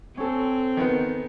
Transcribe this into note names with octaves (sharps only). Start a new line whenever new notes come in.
C4 C#4 A4
D#3 B3